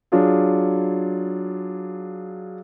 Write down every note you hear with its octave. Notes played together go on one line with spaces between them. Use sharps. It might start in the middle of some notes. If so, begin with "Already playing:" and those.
F#3 D4 F4 G#4